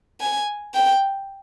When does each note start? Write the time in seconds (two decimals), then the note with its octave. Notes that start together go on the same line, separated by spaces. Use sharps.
0.20 G#5
0.74 G5